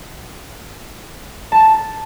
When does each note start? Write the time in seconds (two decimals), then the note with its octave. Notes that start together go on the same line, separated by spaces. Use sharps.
1.52 A5